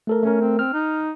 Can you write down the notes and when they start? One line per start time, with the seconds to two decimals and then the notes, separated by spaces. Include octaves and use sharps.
0.07 A3 A4 A#4
0.23 A3 C#4 A#4
0.41 C4
0.59 C4 F6
0.74 D#4